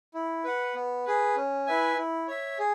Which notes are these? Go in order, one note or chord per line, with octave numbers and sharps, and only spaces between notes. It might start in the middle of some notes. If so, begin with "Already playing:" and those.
E4
B4 F#5
B3
G#4 B4
C#4
E4 B4 E5 G#5
E4
C#5 E5
G#4